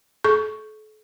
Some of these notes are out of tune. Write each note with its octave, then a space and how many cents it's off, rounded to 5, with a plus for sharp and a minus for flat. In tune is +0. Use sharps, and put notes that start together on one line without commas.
A4 -40 C#6 +0